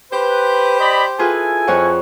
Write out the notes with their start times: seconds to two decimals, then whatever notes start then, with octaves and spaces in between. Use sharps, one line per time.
0.12 G4 B4 C5
0.80 D5 D#5 B5
1.19 E4 F4 G#4 A4 B4 G#5
1.67 F2 C#5 F#5